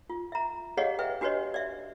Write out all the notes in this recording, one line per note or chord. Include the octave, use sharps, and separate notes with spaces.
F4
E5 A#5
G4 G#4 C#5 D#5 F5 F#5
B4 E5 G5
D4 F#4 G4 B4 C#5 D#5
D5 E5